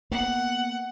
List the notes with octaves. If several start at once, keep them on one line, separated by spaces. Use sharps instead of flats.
A#3 B3 F#5